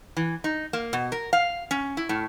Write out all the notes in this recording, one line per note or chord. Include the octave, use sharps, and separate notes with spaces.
E3
D#4
A#3
B2
A#4
F5
C#4
E4
A2